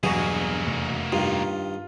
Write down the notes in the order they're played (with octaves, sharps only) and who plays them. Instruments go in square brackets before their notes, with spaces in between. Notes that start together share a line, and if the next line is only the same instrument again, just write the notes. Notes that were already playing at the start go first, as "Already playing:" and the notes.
[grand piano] E1 C#6 [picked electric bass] G2 F#3 [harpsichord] B2 G#4 [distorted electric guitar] A#3 F#4
[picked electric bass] F2 C3 A3
[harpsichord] G2 D#3 [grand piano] F4